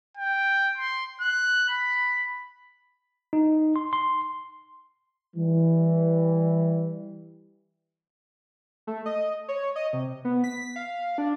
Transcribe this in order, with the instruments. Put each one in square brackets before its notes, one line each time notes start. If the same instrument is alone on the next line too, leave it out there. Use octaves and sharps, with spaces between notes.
[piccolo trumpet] G5
C6
F#6
B5
[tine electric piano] D#4
C6
C6
[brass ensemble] E3 G3
[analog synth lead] A3
D#5
C#5
D#5
C3
B3
B6
F5
D4